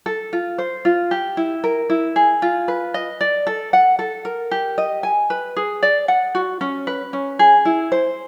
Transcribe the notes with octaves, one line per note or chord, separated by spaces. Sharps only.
A4
F4
C5
F4
G4
E4
A#4
E4
G#4
F4
B4
D#5
D5
A4
F#5
A4
A#4
G4
D#5
G#5
B4
G#4
D5
F#5
F#4
C#4
B4
C#4
G#4
E4
C5